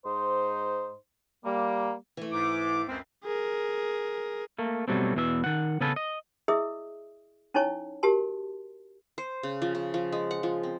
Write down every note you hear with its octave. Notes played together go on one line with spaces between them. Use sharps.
G#2 D#4 C5
G3 A#3
E3 A3
G#2 D6
C#2 F#2 C4
G#4 A#4
A3 A#3
B2 F#3 G3 A3 C4
E2 B2 E3 D#4 E5
D#3 F#5
C#3 B3 C#4 A4 B4
D#5
E4 G#4 D#5 E5 D#6 E6
C#4 D#4 E4 C#5 A5 C#6
F#4 G4 A#4 A5 C6
C5
C#3
F3
C#3
F3
G#3
F#5
F3
C4